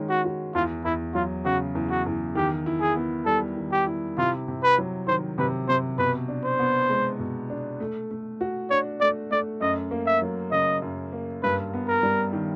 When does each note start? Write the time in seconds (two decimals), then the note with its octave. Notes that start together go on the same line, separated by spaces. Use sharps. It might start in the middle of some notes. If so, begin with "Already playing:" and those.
Already playing: D#3 G#3 C#4
0.09 F#4
0.25 F#4
0.55 E2 F4
0.85 E2 E4
1.15 F#3 F4
1.45 C#3 F#4
1.75 E2
1.90 F#4
2.06 E2
2.35 D#3 G4
2.66 E4
2.81 G#4
2.96 B3
3.26 G3 A4
3.57 D#3
3.72 G4
3.86 E4
4.18 C3 F4
4.48 C3
4.63 B4
4.78 F#3
5.07 D#3 C5
5.38 C3 B4
5.69 C3 C5
5.98 B2 B4
6.28 D4
6.44 C5
6.59 B3
6.90 G#3
7.20 B2
7.50 D4
7.80 A3
8.11 A3
8.41 F#4
8.71 D4 C#5
9.01 A3 D5
9.31 A3 D5
9.61 F#2 D#5
9.91 A#3
10.07 E5
10.22 F#3
10.52 C#3 D#5
10.82 F#2
11.12 A#3
11.43 G2 B4
11.74 B3
11.88 A#4
12.03 G3
12.33 D#3